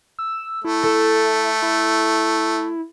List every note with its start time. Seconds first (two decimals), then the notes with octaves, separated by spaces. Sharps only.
0.19 E6
0.65 A3 E4
0.83 A4
1.62 E4